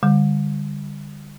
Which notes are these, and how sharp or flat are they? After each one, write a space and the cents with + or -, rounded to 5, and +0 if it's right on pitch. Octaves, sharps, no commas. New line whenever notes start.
D3 +0 G3 +30